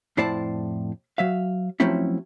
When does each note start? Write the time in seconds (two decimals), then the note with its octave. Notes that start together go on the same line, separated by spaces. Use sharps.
0.17 F2 A2 E4 C5 D5 A5
1.18 F#3 E5 F5
1.80 F3 F#3 A3 C4 C#4 E4